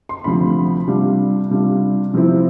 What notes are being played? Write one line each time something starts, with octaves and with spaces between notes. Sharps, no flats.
C6
D2 C3 F3 B5
C3 G3 D4 F4
C3 G3 D4 F4
C3 F3 C4 E4